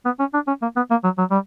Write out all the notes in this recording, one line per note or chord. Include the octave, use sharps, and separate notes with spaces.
B3
C#4
D4
C#4
A#3
B3
A#3
F#3
F#3
G3